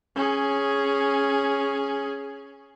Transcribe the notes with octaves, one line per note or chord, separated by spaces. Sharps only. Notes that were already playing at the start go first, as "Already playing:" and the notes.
C#4 G#4